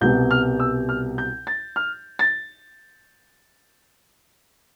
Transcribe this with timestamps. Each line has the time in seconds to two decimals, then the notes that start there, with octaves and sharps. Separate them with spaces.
0.01 C2 B2 G3 G6
0.31 F6
0.60 E6
0.89 F6
1.18 G6
1.47 A6
1.76 F6
2.19 A6